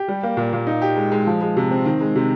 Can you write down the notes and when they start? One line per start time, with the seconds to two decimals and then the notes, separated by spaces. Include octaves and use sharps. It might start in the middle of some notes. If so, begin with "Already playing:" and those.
Already playing: G4
0.08 G3
0.23 A#3
0.37 A#2
0.53 A#2
0.67 D#4
0.82 G4
0.96 G#3
1.12 G#3
1.27 F3
1.41 G#3
1.57 C3
1.71 C4
1.85 D#3
2.01 G#3
2.15 C3